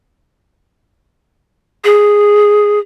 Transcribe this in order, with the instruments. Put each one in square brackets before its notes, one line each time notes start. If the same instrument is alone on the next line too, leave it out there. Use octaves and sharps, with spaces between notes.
[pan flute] G#4